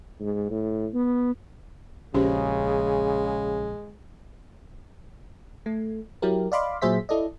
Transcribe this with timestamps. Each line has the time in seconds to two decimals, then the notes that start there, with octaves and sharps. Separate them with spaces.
0.20 G#2
0.50 A2
0.94 B3
2.14 A#1 C#3 G#3 C#4 G4 C5
5.66 A3
6.22 F#3 E4 G4 A#4
6.52 D5 D#5 F5 B5 C6 D6
6.82 A#2 F#3 G#4 C5 E5 B6
7.09 E4 A4 D5 D#5